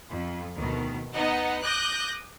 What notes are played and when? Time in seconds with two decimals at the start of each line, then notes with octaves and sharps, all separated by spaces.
0.11 F2
0.57 D2 B2 D#3
1.13 B3 D#4 D#5 F#5
1.62 D6 D#6 F#6 G6 A#6